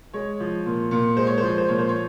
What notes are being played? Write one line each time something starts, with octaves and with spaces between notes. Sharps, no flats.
G#3 C#5
F3
A#2
A#2
G#3 C5
C#5
C5
F3 C#5
C5
A#2 C#5
C5
C#5